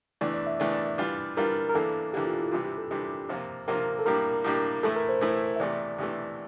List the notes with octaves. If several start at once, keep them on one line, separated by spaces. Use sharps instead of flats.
E2 E3 A3 D4 D5
D5
E5
E2 E3 A3 D4 D5
E3 G3 D4 F4
E3 G3 D4 F4 A#4
A#4
E2 E3 A#3 D4 A4
E2 E3 A#3 D4 G4
F4
E4
C3 E3 G3 D4 F4
G4
A4
C3 E3 G3 D4 G4
C3 F3 A#3 F4
C3 F3 A#3 F4 A#4
A4
A2 G3 A#3 D4 G4 A#4
A2 G3 A#3 D4 G4
A2 E3 A3 E4 A4
A#4
C5
A2 E3 A3 E4
E5
E2 C3 E3 A3 D5
E2 C3 E3 A3